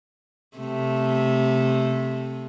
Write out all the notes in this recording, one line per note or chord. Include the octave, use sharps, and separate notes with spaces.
C3 A3